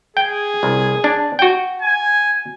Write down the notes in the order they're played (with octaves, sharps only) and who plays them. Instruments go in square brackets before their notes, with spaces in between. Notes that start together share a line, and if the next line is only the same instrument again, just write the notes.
[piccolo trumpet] G#4 [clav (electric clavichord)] G5
[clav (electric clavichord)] C2
D4
F#4 G5
[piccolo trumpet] G#5